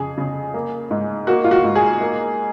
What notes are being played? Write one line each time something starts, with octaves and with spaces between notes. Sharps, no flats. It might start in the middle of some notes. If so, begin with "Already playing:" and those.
Already playing: F2 C#3 G#4
C#3
A#3
G#2
A#3 F#4
F4
F#4
G#2
G#4
A#3